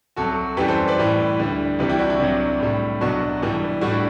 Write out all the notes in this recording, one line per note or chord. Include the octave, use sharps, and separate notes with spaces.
C2 C3 F#3 F#4 A4
F#2 E3 G3 G4 B4
A4 C5
B4 D5
A2 E3 G3
D2 D3 G3
C2 C3 E3 G3 G4 B4
E4 G4
D4 F#4
E4
C2 C3 F#3 D4
A2 G3
C2 B2 F#3 D4 F#4
G2 E3 G3
A2 G3 D4 F#4
E4